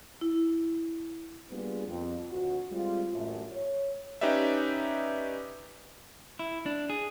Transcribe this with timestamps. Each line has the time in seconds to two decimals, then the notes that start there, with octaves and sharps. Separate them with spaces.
0.21 E4
1.51 G3 A#3 B3 D4 F4 G#4
1.88 F2
2.30 D2 F#4
2.71 G3 G#3 C4 F4
3.13 A1 F#2 A3
3.52 C#5
4.21 C#4 D#4 G4 B4 D5 E5
6.39 E4
6.66 D4
6.90 G#4